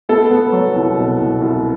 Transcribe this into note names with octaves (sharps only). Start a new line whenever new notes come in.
B3 A4
B3
F#3
C2
B2
C2
C2